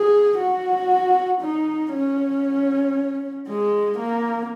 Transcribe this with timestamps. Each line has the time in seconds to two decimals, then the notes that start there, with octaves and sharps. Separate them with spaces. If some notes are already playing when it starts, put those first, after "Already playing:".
Already playing: G#4
0.38 F#4
1.41 D#4
1.93 C#4
3.48 G#3
3.99 A#3